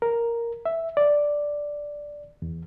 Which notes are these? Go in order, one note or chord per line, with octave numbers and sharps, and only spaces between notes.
A#4
E5
D5
E2